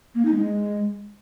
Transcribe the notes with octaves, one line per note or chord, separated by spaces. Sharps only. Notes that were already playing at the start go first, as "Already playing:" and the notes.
A#3
D#4
G#3